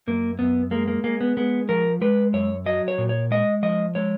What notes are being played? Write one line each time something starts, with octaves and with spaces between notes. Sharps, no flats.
F#2 A#3
F#2 B3
G#3 A#3
A#3
G#3 A#3
B3
G#3 B3
F3 A#4
G#3 B4
F#2 C#5
F#3 D#5
C#5
A#2
C#5
G#3 D#5
F3 D#5
G#3 C#5